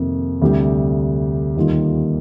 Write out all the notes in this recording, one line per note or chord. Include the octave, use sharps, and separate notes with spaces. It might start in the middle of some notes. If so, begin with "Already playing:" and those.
Already playing: F2 C3 D#3 A#3
D2 C3 G3 D4 G4
D#2 D#3 G3 A#3 F4